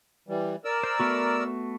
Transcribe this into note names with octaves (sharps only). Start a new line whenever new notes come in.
E3 G3
A#4 D5 E6
C5
A3 B3 F#4